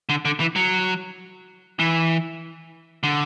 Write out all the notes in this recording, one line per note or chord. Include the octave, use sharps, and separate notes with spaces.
D3
D3
E3
F#3
E3
D3